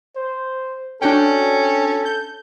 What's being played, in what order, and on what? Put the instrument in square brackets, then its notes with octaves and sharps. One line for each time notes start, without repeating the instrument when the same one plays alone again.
[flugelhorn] C5
[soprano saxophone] C#4 [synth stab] D4 F#4 G5 [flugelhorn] A4
[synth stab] G6